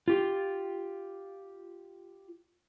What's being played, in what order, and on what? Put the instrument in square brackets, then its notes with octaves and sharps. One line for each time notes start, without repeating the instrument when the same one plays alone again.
[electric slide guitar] F4 G4